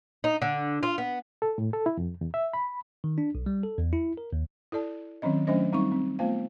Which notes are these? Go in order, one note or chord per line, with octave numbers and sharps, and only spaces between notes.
D#4
D3
F4
B3
A4
A2
A4
E4
F2
E2
E5
B5
D#3
D4
B1
G3
A4
E2
E4
A#4
D#2
E4 A4 D5 A5
D#3 F#3 C4 C#4 D#5
F#3 A3 C#4 D4 C5 D#5
G3 C4 D#4 E5 C#6
C4
A3 B3 F4 C5 F5